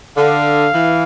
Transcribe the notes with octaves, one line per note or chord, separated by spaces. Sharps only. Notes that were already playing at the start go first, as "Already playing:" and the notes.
D3 F5
E3